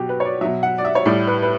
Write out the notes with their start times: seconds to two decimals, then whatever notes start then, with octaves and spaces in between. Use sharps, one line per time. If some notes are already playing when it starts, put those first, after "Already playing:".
Already playing: B2 F#3 F#4 G4
0.09 B4
0.20 C#5
0.25 D5
0.41 B2 F#3 E5
0.63 F#5
0.78 D5
0.85 E5
0.95 C#5
1.05 A2 G3 D5
1.27 B4
1.42 B4